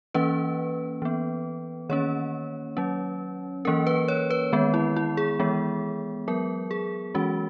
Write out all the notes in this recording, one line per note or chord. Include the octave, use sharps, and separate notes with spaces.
E3 A#3 C#4 B4
E3 B3
D#3 A#3 C#4 C#5
F#3 C#4
E3 A#3 C#4 A#4
B4
C#5
B4
D#3 G#3 B3
E4
E4
G#4
E3 G#3 B3
F#3 B3 A#4
G#4
E3 G#3 C#4 F#4